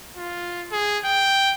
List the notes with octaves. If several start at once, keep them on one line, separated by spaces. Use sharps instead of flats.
F4
G#4
G5